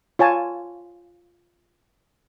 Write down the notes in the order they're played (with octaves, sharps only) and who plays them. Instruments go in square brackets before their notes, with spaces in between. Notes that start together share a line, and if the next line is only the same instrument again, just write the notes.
[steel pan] F4 C#5 G#5 A5